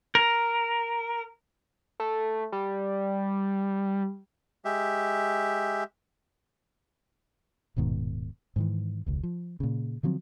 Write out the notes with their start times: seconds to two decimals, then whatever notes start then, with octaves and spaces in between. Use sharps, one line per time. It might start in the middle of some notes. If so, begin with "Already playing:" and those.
0.15 A#4
2.00 A3
2.52 G3
4.65 G#3 G4 E5
7.76 D#1 G#2 B2 D#3
8.56 G#2 D#3 E3
9.06 E1 C#2
9.23 F3
9.60 A#2 C#3
10.03 D3 F3 F#3 C4